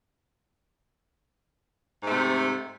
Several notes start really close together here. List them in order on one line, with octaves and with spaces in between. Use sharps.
G#2 A3 C3